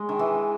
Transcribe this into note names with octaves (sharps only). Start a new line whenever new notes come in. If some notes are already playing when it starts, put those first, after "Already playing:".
Already playing: G#3
D#3
E3